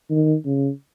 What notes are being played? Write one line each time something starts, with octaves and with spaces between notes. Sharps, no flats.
D#3
C#3